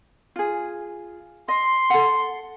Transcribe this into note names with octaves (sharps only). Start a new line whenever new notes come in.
F4 G#4
D#5 C6
A4 F#5